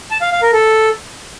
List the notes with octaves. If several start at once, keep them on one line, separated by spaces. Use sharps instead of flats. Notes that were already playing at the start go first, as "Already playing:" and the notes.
A5
F5
F5
A#4
A4